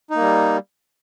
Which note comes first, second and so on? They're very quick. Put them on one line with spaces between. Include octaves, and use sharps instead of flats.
D#4 A#3 G3